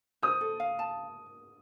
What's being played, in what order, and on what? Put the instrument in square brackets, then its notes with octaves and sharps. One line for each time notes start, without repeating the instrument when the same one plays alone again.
[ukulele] C5 [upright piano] D#6
[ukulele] A4
F5
A5